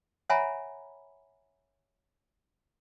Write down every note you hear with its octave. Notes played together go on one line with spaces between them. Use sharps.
C#5 E5 F#5 G#5 A#5 B5